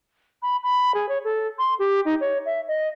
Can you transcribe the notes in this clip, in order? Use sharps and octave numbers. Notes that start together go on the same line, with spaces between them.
B5
B5
G#4
C#5
A4
C6
G4
D#4
C#5
E5
D#5